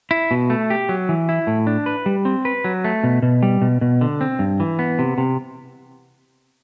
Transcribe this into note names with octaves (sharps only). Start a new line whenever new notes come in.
E4
B2
A3
G4
F#3
E3
E4
A2
D4
B4
G3
C4
B4
F#3
A3
B2
B2
G3
B2
B2
D3
C4
G2
E3
B3
C3
C3